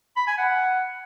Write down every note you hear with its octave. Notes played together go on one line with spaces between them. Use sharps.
B5
G#5
F#5